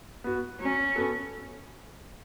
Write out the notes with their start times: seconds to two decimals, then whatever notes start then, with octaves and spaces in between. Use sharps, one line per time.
0.24 B3 F#4
0.60 F#3 C#4
0.96 B3 F#4 A4